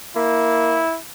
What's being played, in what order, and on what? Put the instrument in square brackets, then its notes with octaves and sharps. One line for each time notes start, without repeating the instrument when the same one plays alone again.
[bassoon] A#3 [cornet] E4